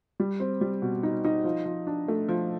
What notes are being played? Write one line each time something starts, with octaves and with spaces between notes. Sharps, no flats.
G3
C4
G3
B2
D#4
D#4
F3
F3
D4
A3
F3